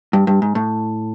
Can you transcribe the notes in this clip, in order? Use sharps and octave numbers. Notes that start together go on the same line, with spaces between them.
G2
G2
G#2
A2